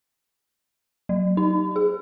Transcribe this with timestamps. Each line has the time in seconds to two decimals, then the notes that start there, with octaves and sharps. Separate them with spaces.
1.09 F#3
1.37 D#4
1.76 G#4